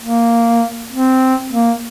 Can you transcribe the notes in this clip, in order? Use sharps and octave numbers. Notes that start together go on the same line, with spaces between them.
A#3
C4
A#3